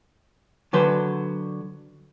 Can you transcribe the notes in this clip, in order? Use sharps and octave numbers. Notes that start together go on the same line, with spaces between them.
D3 F#3 B4 C5